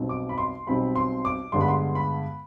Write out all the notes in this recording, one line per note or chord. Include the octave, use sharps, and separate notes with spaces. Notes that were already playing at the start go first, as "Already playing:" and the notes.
Already playing: B1 B2 G3 C4 D#4
D6
B5
C6
B1 B2 G3 C4 D#4 B5
C6
D6
G2 D3 G#3 B3 D4 C6
B5
C6
B5